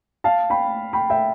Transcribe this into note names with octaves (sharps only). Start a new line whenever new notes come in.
F5 A5
G5 B5
G5 B5
E5 G5